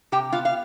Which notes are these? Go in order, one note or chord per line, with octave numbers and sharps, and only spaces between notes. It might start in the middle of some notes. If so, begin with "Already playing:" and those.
C3 G4 G5
B3 F4 F5
F5